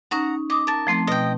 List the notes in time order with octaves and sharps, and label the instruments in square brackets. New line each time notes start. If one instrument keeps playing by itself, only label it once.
[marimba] C#4 D#4 [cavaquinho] F#5 A#5
[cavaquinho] D#5 [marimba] D6 D#6
[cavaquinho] A#4 A5
[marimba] F3 A3 C4
[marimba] B2 [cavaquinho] D#5 G5